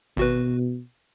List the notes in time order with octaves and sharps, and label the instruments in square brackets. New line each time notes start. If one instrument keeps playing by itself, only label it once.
[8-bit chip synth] G#1 F#4 B4 [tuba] B2